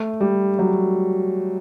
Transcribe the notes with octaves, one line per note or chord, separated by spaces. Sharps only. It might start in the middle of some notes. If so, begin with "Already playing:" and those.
Already playing: A3
G3
F#3